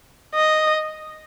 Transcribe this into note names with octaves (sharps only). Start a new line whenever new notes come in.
D#5